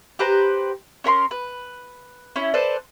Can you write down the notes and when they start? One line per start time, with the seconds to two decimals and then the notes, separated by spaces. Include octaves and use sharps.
0.19 G4 B4 C5 A#5
1.04 C#4 A#4 B5 C6
1.31 B4
2.36 C#4 E4
2.54 A4 B4 C5 D5